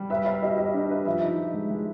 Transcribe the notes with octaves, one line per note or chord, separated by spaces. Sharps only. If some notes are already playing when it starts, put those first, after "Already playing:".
Already playing: G3
B4 E5
B4 F5
G4 D#5
G4 D#5
D4
B4
F3 E5
D#4
F3
G#3
G#3